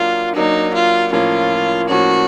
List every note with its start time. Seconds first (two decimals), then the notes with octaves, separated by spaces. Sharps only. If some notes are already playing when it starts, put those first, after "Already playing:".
Already playing: F#3 A#3 D4 F4
0.36 F#3 A#3 D4 D#4
0.74 F4
1.12 A2 F3 A#3 C#4 F4
1.89 A2 F3 A#3 C#4 F#4